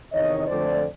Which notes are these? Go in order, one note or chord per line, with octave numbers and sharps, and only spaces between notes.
E2 C3 D#3 C#5 D#5
F2 D3 F3 A3 C5 D5